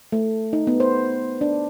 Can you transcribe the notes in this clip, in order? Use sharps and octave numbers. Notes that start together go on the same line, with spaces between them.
A3
D#4
B3
C5
D4